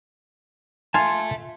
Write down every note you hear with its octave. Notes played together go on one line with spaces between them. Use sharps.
F4 E5 G#5 A5